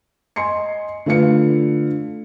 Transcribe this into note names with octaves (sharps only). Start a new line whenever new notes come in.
D#5 G#5 C6 C7 C#7
D3 A3 F4 B4 F5 C#7